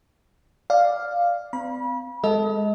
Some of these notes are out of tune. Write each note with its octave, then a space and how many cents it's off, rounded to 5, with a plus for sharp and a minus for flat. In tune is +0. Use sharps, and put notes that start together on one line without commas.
D5 +5 F5 +0
C4 -40 B5 -35
G#3 +0 A4 +0 D#5 +35